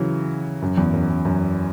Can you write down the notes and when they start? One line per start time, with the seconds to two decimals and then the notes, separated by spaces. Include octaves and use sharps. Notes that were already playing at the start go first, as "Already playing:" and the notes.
Already playing: C#3 E3 F#3
0.62 F#2
0.77 E2
0.93 F#2
1.09 F#2
1.25 F#2